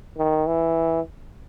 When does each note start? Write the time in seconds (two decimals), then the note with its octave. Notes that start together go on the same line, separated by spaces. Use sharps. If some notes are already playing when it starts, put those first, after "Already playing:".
0.18 D#3
0.47 E3